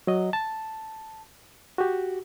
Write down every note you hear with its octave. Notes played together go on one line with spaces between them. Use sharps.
F#3 D#5
A5
F#4 G4